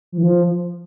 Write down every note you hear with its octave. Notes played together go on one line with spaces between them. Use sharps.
F3
E3
F3